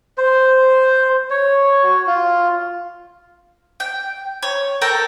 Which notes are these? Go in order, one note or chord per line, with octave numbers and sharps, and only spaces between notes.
C5
C#5
F#4
F4
G5
C#5
A4 A#4 G5 A#5